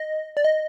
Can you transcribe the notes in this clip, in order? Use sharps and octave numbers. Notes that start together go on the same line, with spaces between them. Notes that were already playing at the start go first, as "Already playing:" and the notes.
Already playing: D#5
D5
D#5